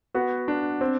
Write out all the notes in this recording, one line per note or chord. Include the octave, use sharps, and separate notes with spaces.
B3 F#4
D4
C4